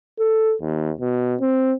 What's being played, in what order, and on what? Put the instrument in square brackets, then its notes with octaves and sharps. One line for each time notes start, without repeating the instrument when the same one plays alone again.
[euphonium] A4
D#2
B2
C4